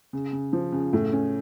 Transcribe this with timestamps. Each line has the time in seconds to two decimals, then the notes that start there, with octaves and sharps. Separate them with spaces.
0.13 C#3
0.33 C#3
0.53 F3
0.72 C#3
0.93 A2
1.13 C#4